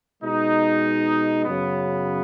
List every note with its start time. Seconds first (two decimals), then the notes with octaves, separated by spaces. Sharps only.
0.22 B2 G#3 D#4
1.44 F#2 C#3 F#3 B3